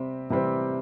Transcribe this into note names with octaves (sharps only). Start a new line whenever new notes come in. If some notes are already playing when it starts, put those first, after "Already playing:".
Already playing: C3 G3 C4
C3 E3 G3 C4